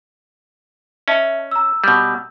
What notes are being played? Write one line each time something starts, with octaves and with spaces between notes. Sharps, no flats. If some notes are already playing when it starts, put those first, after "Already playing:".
C#4 D#5 E5 A5
A#5 E6
B2 G3